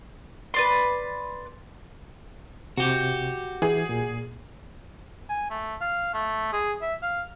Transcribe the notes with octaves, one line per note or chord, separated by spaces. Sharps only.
B4 D5 C6
C3 F#4 G4
E3 G#4
A#2
G#5
A3
F5
A3
G#4
E5
F5